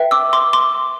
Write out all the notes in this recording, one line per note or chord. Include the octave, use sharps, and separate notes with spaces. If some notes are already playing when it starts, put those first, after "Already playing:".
Already playing: B4 E5 G5
D6 E6
C6 D6
C6 D6